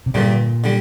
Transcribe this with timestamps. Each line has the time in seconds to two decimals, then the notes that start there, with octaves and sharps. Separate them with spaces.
0.06 C3
0.14 G2 A#2 D3 G3
0.64 D3 G3